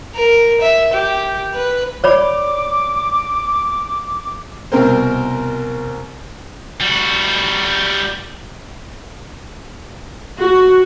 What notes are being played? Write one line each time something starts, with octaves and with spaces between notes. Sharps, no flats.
A#4
E5
G4
B4
C#5 D5 B5 D6
C2 B2 C4 A#4 C5
G3 F#4
F#4